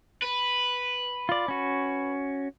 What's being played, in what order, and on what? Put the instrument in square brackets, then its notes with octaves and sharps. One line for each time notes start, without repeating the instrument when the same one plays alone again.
[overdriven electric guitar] B4
[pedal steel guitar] F4 D5
C#4 F#4